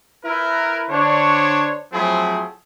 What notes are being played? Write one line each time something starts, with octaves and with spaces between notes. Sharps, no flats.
E4 A#4 B4
D3 D4 C5 C#5
F3 F#3 A3 C4 E4 G#4